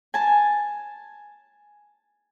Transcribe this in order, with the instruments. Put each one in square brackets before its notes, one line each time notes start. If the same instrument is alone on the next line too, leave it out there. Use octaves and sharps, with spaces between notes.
[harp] G#5 A5